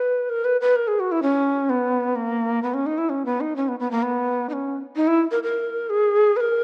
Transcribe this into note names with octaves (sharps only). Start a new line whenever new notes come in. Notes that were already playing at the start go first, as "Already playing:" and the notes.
Already playing: B4
A#4
B4
B4
A#4
G#4
F#4
E4
C#4
B3
A#3
B3
C#4
D#4
E4
C#4
B3
D#4
C#4
B3
B3
A#3
B3
D#4
C#4
D#4
E4
A#4
A#4
G#4
B4
A#4